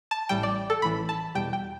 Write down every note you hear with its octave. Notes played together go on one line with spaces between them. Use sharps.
A5
A1 A2 G3 G5
D5
A4
A1 A2 E3 B5
A5
E2 B2 G3 G5
G5